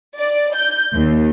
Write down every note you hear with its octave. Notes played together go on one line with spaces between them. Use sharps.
D5
G6
D#2